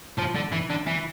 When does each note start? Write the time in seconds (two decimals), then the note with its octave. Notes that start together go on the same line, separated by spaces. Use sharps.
0.19 F3
0.36 D3
0.52 E3
0.70 D3
0.87 E3